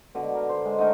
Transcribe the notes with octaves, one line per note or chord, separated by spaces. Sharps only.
B2 D3
A#4
C5
G#3
D3 A3 D#4 A#4